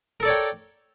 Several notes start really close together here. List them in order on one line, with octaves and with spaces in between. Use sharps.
A#4 A4 D5 C#5 G5